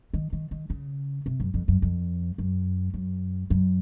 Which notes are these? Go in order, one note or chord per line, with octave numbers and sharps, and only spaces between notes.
D#3
D#3
D#3
C#3
C3
F#2
F2
F#2
F2
F#2
F#2
F#2